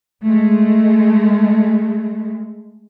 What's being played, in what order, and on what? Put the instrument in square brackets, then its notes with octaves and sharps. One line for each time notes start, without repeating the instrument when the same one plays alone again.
[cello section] G#3 A3